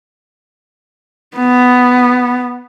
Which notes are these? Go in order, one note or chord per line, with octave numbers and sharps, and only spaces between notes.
B3